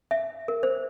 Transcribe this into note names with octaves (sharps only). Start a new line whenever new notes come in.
E5
A#4
C5